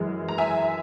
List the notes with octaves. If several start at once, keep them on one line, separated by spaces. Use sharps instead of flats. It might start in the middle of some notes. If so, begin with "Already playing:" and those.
Already playing: F#2 E3 G#3
A#5
E5 G#5